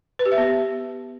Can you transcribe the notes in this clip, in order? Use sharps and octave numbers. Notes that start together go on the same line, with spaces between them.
B4
G4
E5
B3